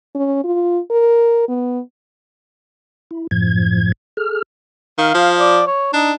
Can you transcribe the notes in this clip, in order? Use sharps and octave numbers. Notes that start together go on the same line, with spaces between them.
C#4
F4
A#4
B3
E4
F#2 A2 F3 G#6
G#4 A4 F6
D#3 F5
F3
D5
C#5
D4 D#4